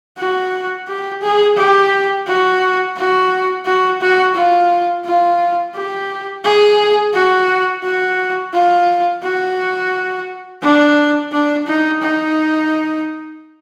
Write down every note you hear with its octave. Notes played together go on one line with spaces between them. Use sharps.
F#4
G4
G#4
G4
F#4
F#4
F#4
F#4
F4
F4
G4
G#4
F#4
F#4
F4
F#4
D4
D4
D#4
D#4